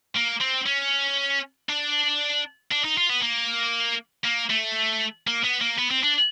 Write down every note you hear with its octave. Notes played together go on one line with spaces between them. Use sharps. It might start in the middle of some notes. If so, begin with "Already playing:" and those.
A#3
C4
C#4
D4
D4
D#4
F4
B3
A#3
A#3
A3
A#3
B3
A#3
B3
C4
D4